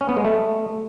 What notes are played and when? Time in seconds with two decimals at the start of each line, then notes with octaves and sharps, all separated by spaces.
0.01 C#4
0.09 B3
0.17 G#3
0.25 A3